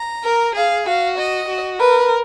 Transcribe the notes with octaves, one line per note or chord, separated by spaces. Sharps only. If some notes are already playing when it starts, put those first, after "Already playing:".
Already playing: A#5
A#4
G#4 F5
F#4 F5
D#5
F#4
A#4 B4